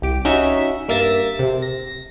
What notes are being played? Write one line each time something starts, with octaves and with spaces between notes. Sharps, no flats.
C2 G4 D7
C#4 D#4 F#4 E5
G2 A#3 E5 E6 A6 A#6
C3
A#6